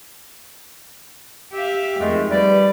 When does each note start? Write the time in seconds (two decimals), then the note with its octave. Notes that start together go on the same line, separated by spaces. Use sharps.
1.52 G4 E5 F5
2.01 F2 D#3 G#3 A3
2.31 G3 B4 D5